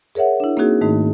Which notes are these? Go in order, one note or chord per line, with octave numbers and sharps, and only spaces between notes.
G#4 A#4 C#5 E5 F#5
D4 E4
A#3 C4 C#4 D#4 F#4 G#4
G#2 D#3 A3 D#4